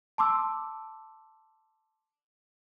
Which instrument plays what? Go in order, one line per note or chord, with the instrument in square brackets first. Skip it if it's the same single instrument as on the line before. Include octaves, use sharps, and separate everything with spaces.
[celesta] A5 C6 D6 E6